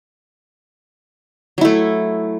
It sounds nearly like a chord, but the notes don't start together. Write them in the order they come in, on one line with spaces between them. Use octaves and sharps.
F#3 E4 A3